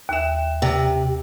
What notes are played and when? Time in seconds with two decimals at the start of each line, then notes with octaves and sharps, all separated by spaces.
0.09 D#2 E5
0.62 C3